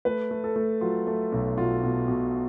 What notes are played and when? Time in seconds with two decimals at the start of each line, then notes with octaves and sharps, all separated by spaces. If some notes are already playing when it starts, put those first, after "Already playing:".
0.05 A3 B4
0.31 A3
0.44 A4
0.56 A3
0.81 F#3 F4
1.07 A3
1.32 B1
1.57 B2 F4
1.83 B2
2.08 B2